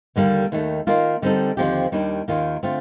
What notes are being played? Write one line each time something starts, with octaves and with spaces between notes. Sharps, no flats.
D#2 D3 G3 A#3
D#2 D#3 A3
D#3 A#3 F4
D3 G3 C4 D#4 A4
D#2 D3 F3 C4 G4
D#2 D#3 G3 D4
D#2 D#3 A#3 F4
D3 A3 C4 F4